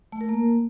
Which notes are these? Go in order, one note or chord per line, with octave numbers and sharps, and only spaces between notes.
A3
A#4
A#3